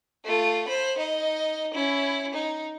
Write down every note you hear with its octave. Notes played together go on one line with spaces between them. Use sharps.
A3 F4
C5 B5
D#4 D#5
C#4 E4
D#4